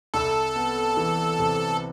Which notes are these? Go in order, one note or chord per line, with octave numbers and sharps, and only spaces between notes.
C2 A4
B3
E3
C3